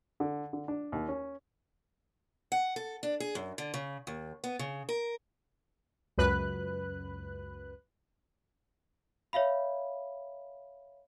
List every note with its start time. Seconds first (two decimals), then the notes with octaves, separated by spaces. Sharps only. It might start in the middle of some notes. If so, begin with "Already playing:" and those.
0.20 D3
0.53 D3
0.68 D4
0.92 D#2
1.09 C#4
2.52 F#5
2.76 A4
3.03 D4
3.20 G#4
3.35 F#2
3.58 D3
3.74 C#3
4.07 D#2
4.44 B3
4.59 C#3
4.89 A#4
6.18 C#2 F#2 B4 F#6
9.33 C#5 E5 F5 B5